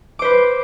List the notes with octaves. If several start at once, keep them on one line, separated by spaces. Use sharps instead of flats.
B4 C5 D6